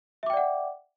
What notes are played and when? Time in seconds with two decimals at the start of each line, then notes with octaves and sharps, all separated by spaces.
0.23 E5
0.26 D6
0.30 G5
0.33 D5
0.37 F#5